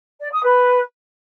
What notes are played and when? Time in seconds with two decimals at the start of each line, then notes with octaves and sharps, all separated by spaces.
0.20 D5
0.32 D#6
0.43 B4